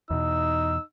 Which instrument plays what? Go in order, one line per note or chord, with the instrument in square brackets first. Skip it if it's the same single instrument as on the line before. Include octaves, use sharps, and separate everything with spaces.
[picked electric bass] E2 B2 [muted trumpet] D#4 [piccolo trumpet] E6